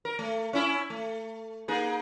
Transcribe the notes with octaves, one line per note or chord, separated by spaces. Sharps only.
A#4
A3
C#4 E4
A3
A#3 D#4 G#4